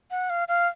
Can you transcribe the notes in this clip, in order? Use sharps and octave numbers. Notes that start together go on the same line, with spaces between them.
F#5
F5
F5